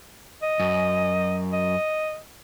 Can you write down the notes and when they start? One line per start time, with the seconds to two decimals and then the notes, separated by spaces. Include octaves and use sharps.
0.42 D#5
0.60 F#2
1.52 D#5